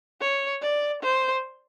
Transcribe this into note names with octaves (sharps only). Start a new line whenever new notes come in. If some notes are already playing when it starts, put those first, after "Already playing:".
C#5
D5
C5